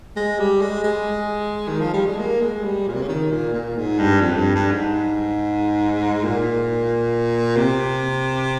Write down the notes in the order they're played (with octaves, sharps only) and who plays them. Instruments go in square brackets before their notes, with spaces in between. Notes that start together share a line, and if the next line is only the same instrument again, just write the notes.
[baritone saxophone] G#3
G3
G#3
G#3
D#3
F3
G3
G#3
A#3
G#3
G3
A#2
C3
C#3
D#3
A#2
A#2
G#2
G2
F2
G2
G2
G#2
A#2
C3